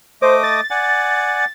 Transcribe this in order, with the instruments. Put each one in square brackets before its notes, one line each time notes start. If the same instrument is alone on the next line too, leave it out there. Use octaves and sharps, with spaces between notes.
[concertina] A3 D#5 D6 [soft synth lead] C5
[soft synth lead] A6
[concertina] D5 F#5 G#5